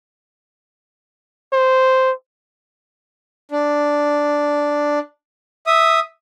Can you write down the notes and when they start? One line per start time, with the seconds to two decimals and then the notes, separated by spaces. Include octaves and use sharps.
1.53 C5
3.51 D4
5.67 E5 D#6